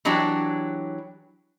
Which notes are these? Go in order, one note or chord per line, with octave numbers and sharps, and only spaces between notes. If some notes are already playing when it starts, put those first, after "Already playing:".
E3 F#3 D4 G4